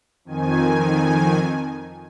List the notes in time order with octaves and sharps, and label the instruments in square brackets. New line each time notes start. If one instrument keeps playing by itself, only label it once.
[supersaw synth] F2 D#3 G#5